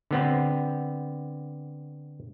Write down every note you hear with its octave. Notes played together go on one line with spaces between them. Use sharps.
D3 B3 C4